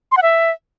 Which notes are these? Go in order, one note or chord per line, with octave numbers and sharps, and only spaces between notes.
C6
F#5
E5